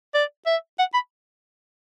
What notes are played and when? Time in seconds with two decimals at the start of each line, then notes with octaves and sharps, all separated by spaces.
0.14 D5
0.46 E5
0.79 F#5
0.94 B5